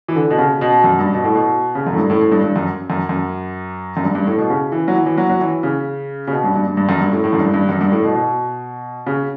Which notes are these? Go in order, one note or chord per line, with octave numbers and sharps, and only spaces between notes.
E3
D3
B2
C#3
B2
F#2
G2
B2
A2
B2
C#3
F#2
A2
G2
A2
A2
G2
G2
F#2
F#2
F#2
F#2
G2
G2
A2
B2
C#3
E3
F#3
E3
E3
F#3
F#3
E3
C#3
C#3
B2
G2
G2
G2
G2
F#2
G2
A2
A2
F#2
G2
G2
F#2
G2
A2
B2
B2
C#3